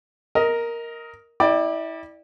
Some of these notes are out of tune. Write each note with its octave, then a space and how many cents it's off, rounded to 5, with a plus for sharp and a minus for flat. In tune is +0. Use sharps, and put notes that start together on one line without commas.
A#4 +0 D#5 +20
E4 -25 D5 +20 G5 +0